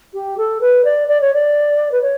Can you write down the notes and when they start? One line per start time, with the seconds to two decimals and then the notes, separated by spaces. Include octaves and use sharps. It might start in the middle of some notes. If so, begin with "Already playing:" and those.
0.14 G4
0.38 A4
0.61 B4
0.85 D5
1.08 D5
1.21 C#5
1.34 D5
1.92 B4
2.02 C#5